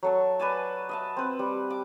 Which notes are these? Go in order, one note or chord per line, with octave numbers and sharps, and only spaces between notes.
F#3 A4 C#6
B4 D5 G#5 A5
D#5 E5 A5
C4 B4
G3
D6